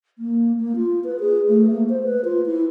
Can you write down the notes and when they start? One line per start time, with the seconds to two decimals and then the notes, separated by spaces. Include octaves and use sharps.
0.19 A#3
0.59 A#3
0.76 F4
1.04 B4
1.20 G#4
1.48 A3
1.71 A#3
1.89 C5
2.04 B4
2.25 F4
2.46 E4